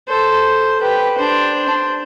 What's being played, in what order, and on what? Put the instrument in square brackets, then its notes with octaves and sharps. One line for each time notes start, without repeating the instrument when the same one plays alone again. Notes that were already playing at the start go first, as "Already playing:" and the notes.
[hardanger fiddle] A4 [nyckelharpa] C5
[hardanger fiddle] G4 [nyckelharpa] B4
[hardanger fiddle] D4 [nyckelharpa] C5
[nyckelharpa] C5